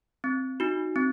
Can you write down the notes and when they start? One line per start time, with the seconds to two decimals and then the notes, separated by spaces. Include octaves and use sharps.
0.24 C4
0.60 D#4 F#4
0.96 C4